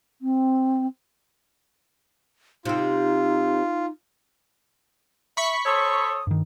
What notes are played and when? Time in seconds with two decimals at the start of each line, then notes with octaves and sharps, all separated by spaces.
0.22 C4
2.65 C3 C4 D#4 F4
5.37 E5 B5 C#6 B6
5.66 A4 C5 C#5 D#6
6.27 G2 D#3